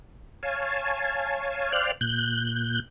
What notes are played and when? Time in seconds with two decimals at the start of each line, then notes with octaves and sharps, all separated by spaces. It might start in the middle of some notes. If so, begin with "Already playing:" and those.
0.43 C#5 F5 G#5 A5
1.72 C5 D5 F5 G5 F6 F#6
2.01 A#2 F#6 G6